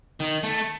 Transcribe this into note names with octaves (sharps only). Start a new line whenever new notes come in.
D#3
A3